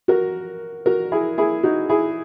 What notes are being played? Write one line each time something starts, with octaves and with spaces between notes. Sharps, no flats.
F#4 A#4
F#4 A#4
E4 G#4
E4 G#4
D#4 F#4
E4 G#4